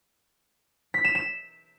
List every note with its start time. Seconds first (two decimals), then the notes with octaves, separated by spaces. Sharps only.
0.94 B6
1.05 E7
1.15 E7